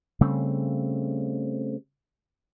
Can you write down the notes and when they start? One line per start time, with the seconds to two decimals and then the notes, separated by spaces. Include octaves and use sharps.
0.21 C#3 G3 A3 C4